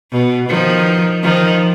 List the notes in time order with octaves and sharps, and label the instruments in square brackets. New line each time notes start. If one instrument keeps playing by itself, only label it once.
[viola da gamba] B2
D#3 F3
D#3 F3